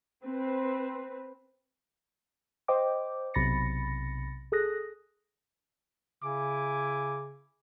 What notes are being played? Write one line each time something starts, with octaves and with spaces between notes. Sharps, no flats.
C4 B4
C5 D#5 G5 D6
B1 C3 B5 A6 A#6 C#7
G#4 A4 D#6 F#6 A#6
C#3 E4 G#5 D6